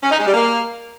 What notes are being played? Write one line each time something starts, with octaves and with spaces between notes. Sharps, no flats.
C#4
D#4
G#3
G3
A#3